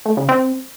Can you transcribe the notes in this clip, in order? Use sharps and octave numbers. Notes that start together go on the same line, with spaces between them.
A3
C#3
C4